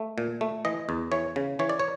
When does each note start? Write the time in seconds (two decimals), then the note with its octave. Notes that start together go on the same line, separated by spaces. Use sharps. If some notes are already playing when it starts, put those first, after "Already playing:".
Already playing: A3
0.18 A#2
0.41 A3
0.65 E3 D#5
0.89 E2
1.12 E3 C#5
1.36 C#3
1.59 E3 C#5
1.69 D5
1.79 C#5